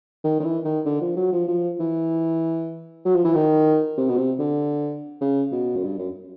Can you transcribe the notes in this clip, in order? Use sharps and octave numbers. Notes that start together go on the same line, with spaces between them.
D#3
D#3
E3
D#3
D3
F3
F#3
F3
F3
E3
F#3
F3
E3
D#3
C3
B2
C3
D3
C#3
B2
F#2
G2
F#2